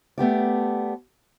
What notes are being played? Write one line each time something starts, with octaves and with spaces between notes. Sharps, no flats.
A3 B3 G4 D5